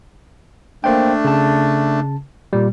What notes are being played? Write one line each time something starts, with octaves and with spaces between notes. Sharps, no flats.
A3 A#3 D4 C5 G5
C#3 A5
A#2 G3